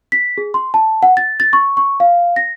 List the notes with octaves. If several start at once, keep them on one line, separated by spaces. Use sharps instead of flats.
B6
G#4
C6
A5
F#5
A6
A6
C#6
C#6
F5
A#6